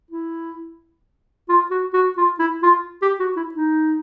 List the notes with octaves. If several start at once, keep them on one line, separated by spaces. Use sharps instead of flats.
E4
F4
F#4
F#4
F4
E4
F4
G4
F#4
E4
D#4